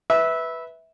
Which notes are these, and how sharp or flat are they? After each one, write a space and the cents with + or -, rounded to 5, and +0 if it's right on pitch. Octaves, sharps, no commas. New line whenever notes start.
B4 +0 E5 -15